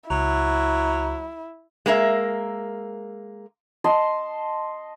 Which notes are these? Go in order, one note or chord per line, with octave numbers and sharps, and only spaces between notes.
C#2 F#3 E4
G#3 A#3 A#4 E5
D#5 A5 C6